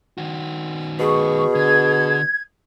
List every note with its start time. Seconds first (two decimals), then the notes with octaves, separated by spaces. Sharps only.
0.18 D#3 F#4
1.00 B2 G#4 C#6
1.55 D3 G#6